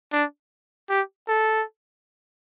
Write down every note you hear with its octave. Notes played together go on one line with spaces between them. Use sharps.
D4
G4
A4